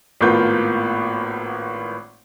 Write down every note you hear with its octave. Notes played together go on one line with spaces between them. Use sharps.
G#1 A2 A#3 B3 F4 G6